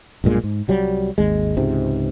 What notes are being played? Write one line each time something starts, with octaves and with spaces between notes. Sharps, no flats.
B1 G2 A#2 G#3
G#2
C2 F#3 G3
G#1 D#2 G#3
C#2 G#2 C3